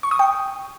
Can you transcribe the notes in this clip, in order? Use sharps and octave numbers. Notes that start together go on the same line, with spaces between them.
C#6
D#6
G5